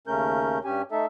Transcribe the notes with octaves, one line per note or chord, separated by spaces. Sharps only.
D#2 C#3 A3 C#4 A#4 G6
G2 C#4 G4 G#5
A3 D#4 A4 E5